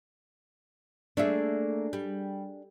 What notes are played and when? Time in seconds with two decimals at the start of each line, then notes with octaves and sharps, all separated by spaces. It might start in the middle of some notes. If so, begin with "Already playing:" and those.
1.17 A3 A#3 D4 G#4 E5
1.93 G3